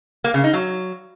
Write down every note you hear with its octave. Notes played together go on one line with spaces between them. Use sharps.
A#3
C#3
D#4
F#3